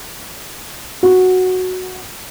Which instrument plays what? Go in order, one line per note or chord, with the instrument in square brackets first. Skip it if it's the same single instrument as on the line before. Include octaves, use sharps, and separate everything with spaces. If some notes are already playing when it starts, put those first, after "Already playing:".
[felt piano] F#4